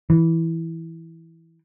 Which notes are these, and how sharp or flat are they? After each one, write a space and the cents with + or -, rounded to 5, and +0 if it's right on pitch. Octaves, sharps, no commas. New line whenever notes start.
E3 -5